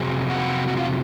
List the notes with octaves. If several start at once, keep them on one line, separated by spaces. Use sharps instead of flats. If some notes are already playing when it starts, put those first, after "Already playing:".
Already playing: F2 C3 F#3 G#4
F#4
F#4
F4